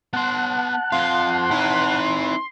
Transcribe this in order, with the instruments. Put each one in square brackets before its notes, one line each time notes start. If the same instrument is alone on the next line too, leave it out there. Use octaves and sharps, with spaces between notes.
[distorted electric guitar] B3 C6 [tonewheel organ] F#5 A5 F#6
[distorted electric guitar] F2 F3 [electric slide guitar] F5 [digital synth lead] C6
[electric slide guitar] C4 D#4 C#5 [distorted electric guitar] E4 B4